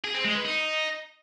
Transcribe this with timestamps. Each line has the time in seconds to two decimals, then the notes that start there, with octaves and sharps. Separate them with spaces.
0.05 G#4
0.15 C4
0.25 G#3
0.35 B4
0.45 D#4